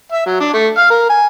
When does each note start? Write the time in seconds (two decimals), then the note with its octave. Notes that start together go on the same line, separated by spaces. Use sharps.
0.12 E5
0.26 F#3
0.40 D4
0.53 A3
0.77 F5
0.91 A#4
1.09 G#5